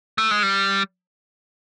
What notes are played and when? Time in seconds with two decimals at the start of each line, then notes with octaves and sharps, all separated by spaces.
0.18 A3
0.31 G#3
0.43 G3